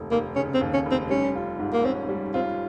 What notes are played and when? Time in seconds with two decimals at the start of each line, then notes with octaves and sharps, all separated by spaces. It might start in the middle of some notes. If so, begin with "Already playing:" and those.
Already playing: F1 D#2
0.11 F1 A#3
0.36 C#3 C#4
0.54 C4
0.61 D#2
0.74 C#4
0.86 F1
0.91 C4
1.10 G3 C#4
1.35 F4
1.60 G#2
1.73 A#3
1.84 C4 C#4
2.09 G3
2.34 C4 F4